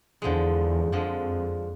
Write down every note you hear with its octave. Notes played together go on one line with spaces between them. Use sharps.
E2 D3 F3 G#3
F2 D3 F3 G#3